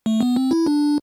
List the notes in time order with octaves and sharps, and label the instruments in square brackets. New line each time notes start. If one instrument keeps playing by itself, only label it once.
[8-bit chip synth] A3
B3
C4
E4
D4